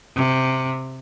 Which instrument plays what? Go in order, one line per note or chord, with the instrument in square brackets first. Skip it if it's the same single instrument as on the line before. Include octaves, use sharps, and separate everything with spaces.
[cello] C3